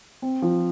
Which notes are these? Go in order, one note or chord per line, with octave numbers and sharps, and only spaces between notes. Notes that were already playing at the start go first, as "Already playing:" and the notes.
C4
F3